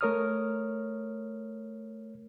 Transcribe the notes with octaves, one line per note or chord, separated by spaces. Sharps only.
A3 A#4 C#5 D#6 F6